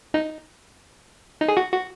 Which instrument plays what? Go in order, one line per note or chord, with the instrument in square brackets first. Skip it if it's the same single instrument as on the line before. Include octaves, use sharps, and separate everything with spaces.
[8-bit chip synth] D#4
D#4
G#4
F#4
F#4